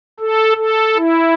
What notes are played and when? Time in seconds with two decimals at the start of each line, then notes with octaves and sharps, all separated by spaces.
0.20 A4
0.57 A4
0.96 E4